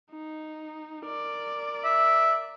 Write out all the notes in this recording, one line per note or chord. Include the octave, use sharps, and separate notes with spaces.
D#4
A#4 D5
E5